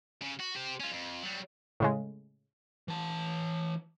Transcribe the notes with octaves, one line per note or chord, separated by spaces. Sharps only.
C#3
F#4
G4 C5
C#4 F4
F2
F#3 G3
A2 C#3 G#3
E3 A5